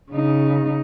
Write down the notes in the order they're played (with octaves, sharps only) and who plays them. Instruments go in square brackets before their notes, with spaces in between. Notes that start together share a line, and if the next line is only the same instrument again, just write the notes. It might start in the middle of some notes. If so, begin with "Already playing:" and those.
[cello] C#3 D#4